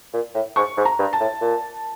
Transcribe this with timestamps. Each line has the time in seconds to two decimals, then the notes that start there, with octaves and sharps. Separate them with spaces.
0.14 A#2
0.35 A2
0.56 G#2 C#6
0.77 G#2
0.85 A#5
0.99 G2
1.13 A5
1.20 A2
1.41 A#2